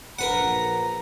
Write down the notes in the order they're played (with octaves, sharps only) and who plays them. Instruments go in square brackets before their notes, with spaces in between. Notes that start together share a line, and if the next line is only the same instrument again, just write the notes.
[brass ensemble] A#1 A#5 [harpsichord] A#4 B4 F#5